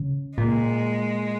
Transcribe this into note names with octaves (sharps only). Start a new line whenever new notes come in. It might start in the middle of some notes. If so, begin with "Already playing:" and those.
Already playing: C#3
A#2 G#3